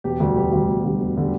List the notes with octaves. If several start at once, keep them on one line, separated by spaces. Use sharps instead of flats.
E1 G4
D2 D3 G3
E1 G4
D2 D3 G3
E1
D2 D3 G3
E1
D3 G3